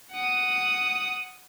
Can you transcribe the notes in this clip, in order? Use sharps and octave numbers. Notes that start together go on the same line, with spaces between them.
F#5 D#6